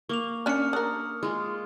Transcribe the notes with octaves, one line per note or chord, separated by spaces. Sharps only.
A#3 C#6 D6 F7
C#4 D4 F6 C#7
D4 A#4 D#6
G#3 F4